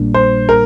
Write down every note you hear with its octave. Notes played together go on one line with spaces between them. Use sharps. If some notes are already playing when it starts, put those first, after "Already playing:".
Already playing: A#1 A#2 G3 A#3 D4
C5
A#4